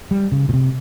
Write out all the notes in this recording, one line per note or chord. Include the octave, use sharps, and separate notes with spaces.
G3
C#3
A#2
C3